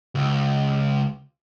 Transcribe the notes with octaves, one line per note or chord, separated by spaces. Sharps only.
C#2